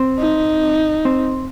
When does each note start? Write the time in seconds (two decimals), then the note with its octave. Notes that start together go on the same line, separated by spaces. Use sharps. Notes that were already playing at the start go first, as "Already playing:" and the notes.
Already playing: C4
0.19 D#4
1.05 C4